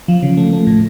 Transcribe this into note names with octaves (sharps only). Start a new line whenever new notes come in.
F3
C#3
A3
A3
A2